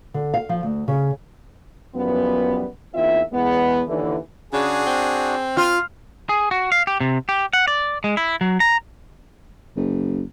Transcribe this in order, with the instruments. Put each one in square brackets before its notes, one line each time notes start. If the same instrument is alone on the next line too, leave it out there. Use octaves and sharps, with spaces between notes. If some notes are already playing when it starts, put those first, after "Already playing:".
[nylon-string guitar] D3
F5
F3
D2
C#3
[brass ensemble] F#2 E3 F3 G3 B3
E2 A#3 C4 D#4 F4 E5
E2 G#3 B3
D#2 D3 E3
[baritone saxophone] C#3 [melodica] D4 F#4 [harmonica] G#4
[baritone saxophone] C4
[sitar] F4 [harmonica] F6
[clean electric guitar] G#4
F#4
F5
G4
C3
G4
F#5
D5
G#3
E4
F#3
A#5
[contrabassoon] F#1